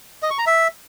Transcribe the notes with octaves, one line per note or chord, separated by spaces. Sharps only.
D#5
C#6
A#5
E5